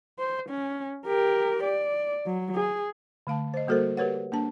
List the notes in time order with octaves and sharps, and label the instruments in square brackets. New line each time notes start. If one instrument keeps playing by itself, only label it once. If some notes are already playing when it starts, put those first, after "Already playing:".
[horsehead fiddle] C5
C#4
G4 A#4
D5
F#3
G#4
[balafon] D3 A3 F5 A5
C5 D#5
G3 A#3 F#4 A4 A#4 C5
G4 A#4 B4 C#5 F#5
A#3 D4 A5